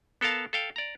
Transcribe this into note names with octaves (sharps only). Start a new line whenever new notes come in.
B3 A4 A#4 F5 A5
A4 F5 G5
D5 A#5